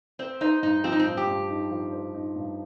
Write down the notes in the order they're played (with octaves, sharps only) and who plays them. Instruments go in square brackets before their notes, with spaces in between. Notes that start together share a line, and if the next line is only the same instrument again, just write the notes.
[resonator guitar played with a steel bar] C4 [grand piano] C5
[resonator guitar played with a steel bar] D#4 [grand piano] C5
[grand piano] G2 [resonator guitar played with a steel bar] D#4
[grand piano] F3 [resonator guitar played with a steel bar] C4
[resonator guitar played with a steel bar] D#4
C4
[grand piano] G2
[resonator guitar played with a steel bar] G4
[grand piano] G2
D#4
F3
C5
D#4
G2